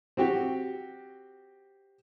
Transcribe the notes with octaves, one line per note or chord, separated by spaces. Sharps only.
C4 F#4 G4